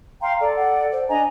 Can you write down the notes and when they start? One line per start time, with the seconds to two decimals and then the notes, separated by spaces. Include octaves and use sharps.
0.21 F5 G5 A#5 C6
0.39 A4 D5
0.56 F#5
0.92 C5
1.09 D4 D#5 G#5 A#5